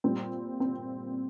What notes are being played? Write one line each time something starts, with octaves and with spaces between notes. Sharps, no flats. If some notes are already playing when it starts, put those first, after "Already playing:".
A#2 G3 C4
C4